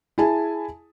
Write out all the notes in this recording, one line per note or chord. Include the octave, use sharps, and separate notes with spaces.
E4 G#4 G#5 A5